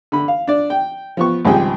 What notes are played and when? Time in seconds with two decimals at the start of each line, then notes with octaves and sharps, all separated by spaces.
0.12 D3 B5
0.28 F5
0.47 D4 D5
0.70 G5
1.17 F3 B3 C#6
1.45 G#1 C#2 F3 G3 G#4 G5